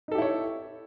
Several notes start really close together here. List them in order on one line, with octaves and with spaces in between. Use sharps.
D#4 A4 G4 E4 C#5